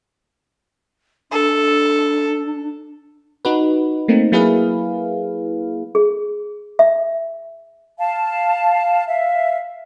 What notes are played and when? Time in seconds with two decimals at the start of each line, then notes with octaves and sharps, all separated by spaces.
1.31 D4 A4
3.45 D#4 F#4 B4
4.08 A3 A#3 C4 D#4
4.32 F#3 A#3 E4 G#4 B4 F5
5.95 G#4
6.79 E5
7.99 F5 A5
9.08 E5 F5